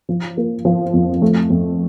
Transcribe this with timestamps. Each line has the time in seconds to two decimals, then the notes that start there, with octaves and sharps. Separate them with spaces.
0.09 F3
0.37 A#3
0.65 F3
0.93 F2
1.22 A3
1.50 F2